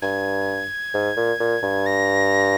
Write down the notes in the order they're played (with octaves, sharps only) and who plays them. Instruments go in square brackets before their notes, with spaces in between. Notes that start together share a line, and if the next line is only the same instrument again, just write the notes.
[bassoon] G2 [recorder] G#6
[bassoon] G#2
A#2
A#2
G2
[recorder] A#6